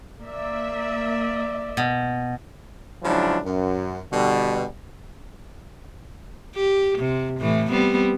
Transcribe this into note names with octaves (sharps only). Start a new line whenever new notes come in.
A#3 D5 E5
B2
C#3 F3 F#3 G#3 D4 E4
F#2
B2 D3 G3
G4
C3
A2 E3 A3
G3 B3 C4